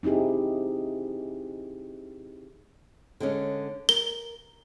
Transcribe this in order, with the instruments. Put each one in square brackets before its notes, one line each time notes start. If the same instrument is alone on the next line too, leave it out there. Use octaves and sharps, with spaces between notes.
[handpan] C4 D#4 E4 G4 G#4
[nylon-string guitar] D3 G#3 C#4
[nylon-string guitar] A#4 [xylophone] G7